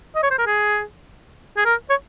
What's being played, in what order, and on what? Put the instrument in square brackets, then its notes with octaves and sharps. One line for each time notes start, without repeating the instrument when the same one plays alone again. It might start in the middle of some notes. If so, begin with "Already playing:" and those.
[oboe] D#5
C#5
C5
A#4
G#4
G#4
A#4
C#5